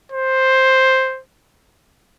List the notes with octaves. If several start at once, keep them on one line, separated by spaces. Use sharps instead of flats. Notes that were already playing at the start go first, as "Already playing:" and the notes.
C5